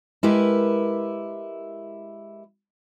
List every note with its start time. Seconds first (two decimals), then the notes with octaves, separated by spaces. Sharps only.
0.23 G#3 E4 G4 A#4 B4